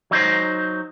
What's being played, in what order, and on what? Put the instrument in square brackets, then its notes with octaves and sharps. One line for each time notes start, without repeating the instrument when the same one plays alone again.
[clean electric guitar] F#3 D#4 C5